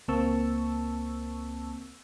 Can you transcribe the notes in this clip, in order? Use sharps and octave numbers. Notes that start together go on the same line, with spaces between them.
C#2 A#3 C4 A5 C#6 E6